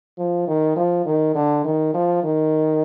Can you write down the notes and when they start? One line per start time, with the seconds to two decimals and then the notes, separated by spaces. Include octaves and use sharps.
0.18 F3
0.48 D#3
0.76 F3
1.06 D#3
1.35 D3
1.65 D#3
1.94 F3
2.23 D#3